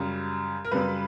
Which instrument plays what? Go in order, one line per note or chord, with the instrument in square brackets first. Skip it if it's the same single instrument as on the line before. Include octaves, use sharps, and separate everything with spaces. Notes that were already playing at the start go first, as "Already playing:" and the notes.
Already playing: [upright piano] F#2 C#3 G3
A#4
F#2 C#3 G3 B4